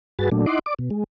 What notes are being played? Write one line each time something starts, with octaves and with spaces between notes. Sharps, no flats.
G2 F#4 G#4 B4 A6
A#2 F#3 A3 D4
D#4 E4 D#5 F#5 C6 D6
D5 D6
B2
G#3